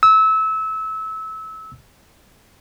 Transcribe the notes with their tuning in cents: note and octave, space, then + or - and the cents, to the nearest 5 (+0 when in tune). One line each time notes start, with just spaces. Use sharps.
E6 -25